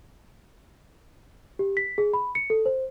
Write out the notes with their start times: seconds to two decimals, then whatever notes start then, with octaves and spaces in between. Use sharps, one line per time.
1.59 G4
1.77 B6
1.98 G#4
2.14 B5
2.35 C#7
2.50 A4
2.66 C5